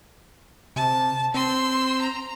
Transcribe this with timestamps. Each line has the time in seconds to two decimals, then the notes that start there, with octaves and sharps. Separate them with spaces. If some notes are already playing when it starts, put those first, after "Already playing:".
0.76 C3 A5
1.34 C4 C6 E6
2.01 A#5